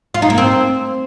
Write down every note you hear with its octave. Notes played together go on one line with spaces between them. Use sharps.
F4
D#4
A#3
C4